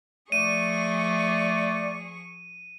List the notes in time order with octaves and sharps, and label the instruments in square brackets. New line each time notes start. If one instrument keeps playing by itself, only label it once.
[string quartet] F3 G#4 C#6 [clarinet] A3 [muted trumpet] D5 [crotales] D#7